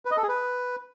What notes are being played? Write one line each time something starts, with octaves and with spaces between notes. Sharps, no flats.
B4
D#5
A4
G#4
B4